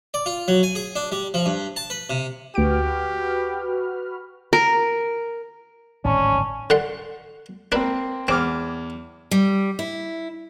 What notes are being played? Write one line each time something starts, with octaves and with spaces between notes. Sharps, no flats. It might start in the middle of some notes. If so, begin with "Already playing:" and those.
D5
F4
F#3
G#5
G#4
D4
G3
F3
G2
A5
B4
C3
D2 F#4 G4 B4 F6 D7
A#4
D1 G#1 D#3 C#4 D5 A5 C#6
D3 F#5 C6
A#3 C4 D4 B4
E2 C4 D6 F6
G3
E4